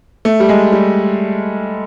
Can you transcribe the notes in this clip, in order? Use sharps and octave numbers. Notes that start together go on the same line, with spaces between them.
A3
G3
G#3
G3